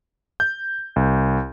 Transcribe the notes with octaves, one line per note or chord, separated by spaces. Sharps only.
G6
C2